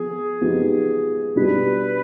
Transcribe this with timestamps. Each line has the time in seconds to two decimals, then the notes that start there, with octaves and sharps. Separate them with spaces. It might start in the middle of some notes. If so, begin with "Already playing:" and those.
Already playing: F3 B3 G#4
0.41 F3 B3 D#4 G4
1.35 B2 G3 D4 G4 B4